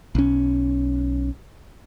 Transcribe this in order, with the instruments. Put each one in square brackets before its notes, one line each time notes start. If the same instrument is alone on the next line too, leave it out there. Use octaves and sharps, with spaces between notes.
[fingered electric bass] B1 C#4